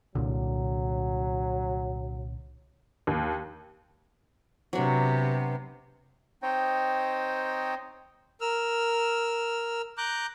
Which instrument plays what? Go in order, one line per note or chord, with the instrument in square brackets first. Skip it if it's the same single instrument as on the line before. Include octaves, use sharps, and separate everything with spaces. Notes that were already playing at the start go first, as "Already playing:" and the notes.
[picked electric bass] C2 A#2 D3 [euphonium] F#3
[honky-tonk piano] D#2
[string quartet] C3 B3 [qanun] F#3 D4
[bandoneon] C4 D#4 C5 C#5 D#5 G5
[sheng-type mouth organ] A#4 E6 F6
A#5 D6 F#6 G6